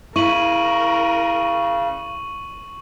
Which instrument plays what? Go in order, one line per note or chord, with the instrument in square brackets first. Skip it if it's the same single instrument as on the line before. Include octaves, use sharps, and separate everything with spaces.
[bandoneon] C#3 [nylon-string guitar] E4 [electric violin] A#4 [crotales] C#6 D#7 F#7